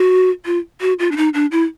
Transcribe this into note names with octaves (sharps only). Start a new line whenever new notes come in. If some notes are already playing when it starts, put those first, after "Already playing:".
Already playing: F#4
F4
F#4
F4
D4
D#4
D4
E4